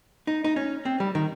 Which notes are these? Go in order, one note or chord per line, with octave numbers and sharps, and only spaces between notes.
D#4
D#4
C#4
C4
G3
D#3